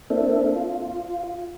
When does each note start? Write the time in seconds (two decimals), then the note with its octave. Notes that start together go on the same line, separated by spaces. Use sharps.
0.10 A#3 C4 D4 E4 A4
0.56 F4